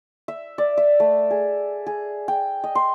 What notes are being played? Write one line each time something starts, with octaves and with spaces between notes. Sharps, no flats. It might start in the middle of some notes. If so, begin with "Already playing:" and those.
E5
D5
E5
A3
G#4
G#4
G5
D#5
C6